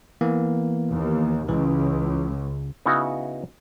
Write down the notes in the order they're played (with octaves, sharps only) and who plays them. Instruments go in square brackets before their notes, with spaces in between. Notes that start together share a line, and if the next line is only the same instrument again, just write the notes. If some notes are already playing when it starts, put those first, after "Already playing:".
[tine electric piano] E3 A#3 B3
[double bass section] D#2
[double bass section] C#2 [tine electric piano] E3
[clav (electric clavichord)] C#3 B3 D#4 E4 F#4